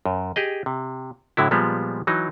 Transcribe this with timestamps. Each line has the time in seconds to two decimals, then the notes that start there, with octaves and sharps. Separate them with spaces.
0.06 F#2
0.36 G4 G#4 D#5
0.66 C3
1.37 A2 D3 F#3 E4
1.51 A#2 F3 G3 G#3 B3
2.07 E3 F#3 D#4